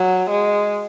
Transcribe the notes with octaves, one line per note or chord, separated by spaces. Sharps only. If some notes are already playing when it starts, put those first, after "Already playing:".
Already playing: F#3
G#3